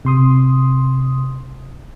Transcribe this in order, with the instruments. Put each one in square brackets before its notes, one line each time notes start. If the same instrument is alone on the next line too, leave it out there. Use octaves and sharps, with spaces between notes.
[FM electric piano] C3 C6 D#6